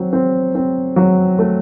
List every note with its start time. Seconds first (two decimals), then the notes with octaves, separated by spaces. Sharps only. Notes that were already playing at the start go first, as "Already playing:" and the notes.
Already playing: F#3 C4
0.13 C4
0.55 C4
0.96 F#3
1.39 A3